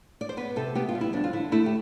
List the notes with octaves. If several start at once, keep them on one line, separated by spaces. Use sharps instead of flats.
D5
C5
B3 B4
C3 A4
B3 G4
F4
G3
E4
F2 D4
F4
D3 E4
A3 E4
G4